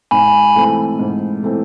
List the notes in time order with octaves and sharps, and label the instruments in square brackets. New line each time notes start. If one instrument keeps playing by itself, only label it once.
[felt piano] G#2 [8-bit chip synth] G#5 B5
[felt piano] E3 A3 C4
G#2
E3 A3 C4